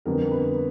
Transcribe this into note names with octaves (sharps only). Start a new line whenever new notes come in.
F2 D3 G3 B3 A#4
B4